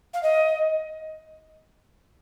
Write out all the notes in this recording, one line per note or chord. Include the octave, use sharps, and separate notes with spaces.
F5
D#5